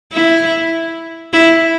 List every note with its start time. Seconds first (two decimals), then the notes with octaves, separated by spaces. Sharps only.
0.13 E4
1.33 E4